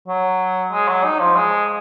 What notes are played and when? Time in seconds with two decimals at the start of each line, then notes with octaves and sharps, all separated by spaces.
0.08 F#3
0.72 G#3
0.88 F#3
1.04 D#4
1.19 F3
1.36 G#3